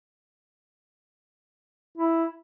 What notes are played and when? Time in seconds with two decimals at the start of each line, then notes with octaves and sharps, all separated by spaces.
1.97 E4